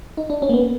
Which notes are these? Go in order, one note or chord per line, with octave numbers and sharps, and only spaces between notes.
D#4
D4
C#4
A#3
B3